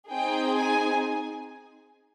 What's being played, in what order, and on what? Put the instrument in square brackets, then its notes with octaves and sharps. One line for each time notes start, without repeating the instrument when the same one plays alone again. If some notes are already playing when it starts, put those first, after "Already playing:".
[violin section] C4 D#4 G#4 G5
G#5